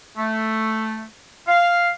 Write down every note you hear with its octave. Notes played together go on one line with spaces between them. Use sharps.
A3
F5